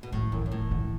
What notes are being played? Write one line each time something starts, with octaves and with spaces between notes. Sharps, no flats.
B2
A2 F#3
E3
F#2 E3
D3
F#2
A2 F#3
E3
D3
E3